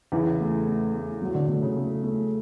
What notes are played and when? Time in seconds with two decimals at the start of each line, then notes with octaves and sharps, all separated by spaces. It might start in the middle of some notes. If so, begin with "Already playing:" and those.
0.12 E2 C#3 E3
0.40 A3
0.67 A3
0.94 A3
1.22 F#3
1.35 D3
1.48 D3 A3
1.62 C#3
1.76 A3
2.03 A3